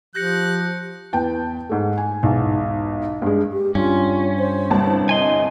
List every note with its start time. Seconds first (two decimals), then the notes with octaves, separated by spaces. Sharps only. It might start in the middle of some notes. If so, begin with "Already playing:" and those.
0.15 F3 G4 F#6 G6 A#6 C#7
1.13 E2 B4 G5 A5
1.69 G#2 A3
1.98 G#5
2.23 B1 E2 G#2
3.22 G2 G#3
3.52 G4
3.75 G2 C#4 F4
4.38 C5
4.70 G1 C2 A5
5.09 D#5 G#5 C6